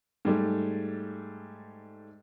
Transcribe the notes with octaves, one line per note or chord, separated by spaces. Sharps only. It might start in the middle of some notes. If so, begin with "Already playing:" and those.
G#2 G3 A3